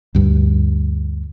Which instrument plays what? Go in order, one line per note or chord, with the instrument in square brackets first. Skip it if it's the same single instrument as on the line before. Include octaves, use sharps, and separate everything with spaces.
[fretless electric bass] D2 G2